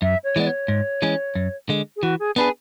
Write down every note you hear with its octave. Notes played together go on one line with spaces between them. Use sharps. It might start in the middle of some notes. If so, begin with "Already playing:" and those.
F#2 E5
C#5
E3 G#3 B3 D5
C#5
G#2
E3 G#3 C#4
F#2
D3 G#3
G#4
E3 F#4
G#4
B3 D4 G#4 B4